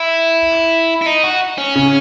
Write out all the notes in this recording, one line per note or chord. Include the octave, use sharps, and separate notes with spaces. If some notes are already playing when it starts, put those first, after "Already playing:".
Already playing: E4
E4
D#4
F#4
C#4
C#3